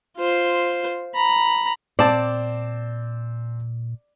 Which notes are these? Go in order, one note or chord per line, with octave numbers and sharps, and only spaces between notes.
F4 C5
A#5 B5
A#2 C4 D5 A5 D6